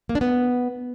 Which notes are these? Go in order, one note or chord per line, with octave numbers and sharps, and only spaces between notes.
A#3
D4
B3